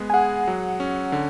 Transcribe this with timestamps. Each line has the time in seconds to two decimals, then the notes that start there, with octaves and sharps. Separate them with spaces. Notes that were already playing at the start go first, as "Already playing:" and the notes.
Already playing: G#3 B3
0.10 G#5
0.14 G#4 F#5
0.47 F#3
0.80 C#4
1.12 D3